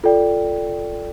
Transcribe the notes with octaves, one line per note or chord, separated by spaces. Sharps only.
F4 A4 D5 G5